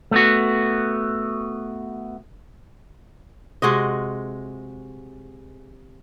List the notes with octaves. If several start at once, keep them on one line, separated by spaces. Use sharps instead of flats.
A3 B3 F#4
C3 G#3 F#4 D#5